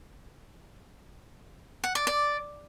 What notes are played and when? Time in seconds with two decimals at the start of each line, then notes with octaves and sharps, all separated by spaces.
1.84 F#5
1.95 D5
2.07 D5